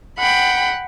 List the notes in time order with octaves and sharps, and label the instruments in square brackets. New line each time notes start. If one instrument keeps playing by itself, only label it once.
[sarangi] F#5 [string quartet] G5 B5